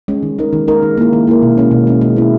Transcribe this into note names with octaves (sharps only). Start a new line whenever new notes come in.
G#3 C#4
D#3
G#3 D#4 A#4
D#3
G#3 D#4 A#4
D#3
A#3 E4 A#4
D#3
A#3 E4 A#4
B2
G#3 C#4
B2
G#3 C#4
G#3
B3 E4